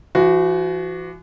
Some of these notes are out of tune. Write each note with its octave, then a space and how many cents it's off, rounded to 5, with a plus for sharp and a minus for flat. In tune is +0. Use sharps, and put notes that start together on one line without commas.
E3 +45 F#4 +0